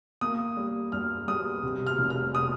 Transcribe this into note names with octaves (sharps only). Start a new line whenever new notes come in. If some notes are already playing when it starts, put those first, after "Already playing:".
A#3 D#6
G3
G2 F6
G3 D#6
C3
F6
F1
F6
D#6